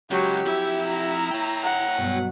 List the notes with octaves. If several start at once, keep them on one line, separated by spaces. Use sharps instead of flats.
C#2 F#3 F#4 G4
F2 E4 E5
A#5
C#5 G5
F#5
G2 B2 F#3